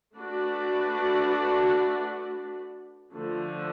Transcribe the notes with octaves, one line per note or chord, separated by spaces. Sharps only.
A3 D4 F#4 B4 D5
D3 F3 A3